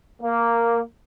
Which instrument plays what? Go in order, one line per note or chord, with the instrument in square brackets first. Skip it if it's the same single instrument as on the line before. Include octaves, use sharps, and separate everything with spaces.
[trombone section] A#3